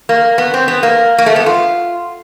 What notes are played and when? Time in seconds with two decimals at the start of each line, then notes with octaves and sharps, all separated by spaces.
0.09 A#3
0.38 B3
0.54 C4
0.68 B3
0.83 A#3
1.18 A#3
1.26 A3
1.36 B3
1.46 F4